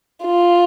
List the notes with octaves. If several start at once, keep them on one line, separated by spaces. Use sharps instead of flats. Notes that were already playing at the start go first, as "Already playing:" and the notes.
F4